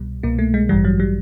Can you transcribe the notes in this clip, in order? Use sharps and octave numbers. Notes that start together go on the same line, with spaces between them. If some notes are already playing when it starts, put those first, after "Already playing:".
Already playing: C2 B2 G3
C2 B2 A#3
A3
G#3
A1 G2 E3 G3
F#3
G3